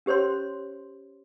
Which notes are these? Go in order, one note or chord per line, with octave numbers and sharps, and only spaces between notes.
C#4 G4 C5 C#5 C6